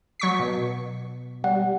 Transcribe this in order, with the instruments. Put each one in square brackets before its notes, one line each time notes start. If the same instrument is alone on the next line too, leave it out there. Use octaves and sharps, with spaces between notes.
[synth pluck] F#3 C#6 B6
[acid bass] B2
[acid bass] G3 [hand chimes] F#5